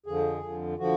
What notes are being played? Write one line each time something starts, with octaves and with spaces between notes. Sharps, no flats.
F2 D3 F3 G#4
F2 D3 F3
D3 F3 F#4